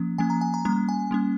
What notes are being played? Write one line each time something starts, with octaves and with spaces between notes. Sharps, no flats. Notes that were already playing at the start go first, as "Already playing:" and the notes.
Already playing: F3 A#3 C#4
F3 A#3 C#4 G#5
A#5
G#5
A#5
G3 A#3 C#4 A#5
G#5
G3 A#3 C#4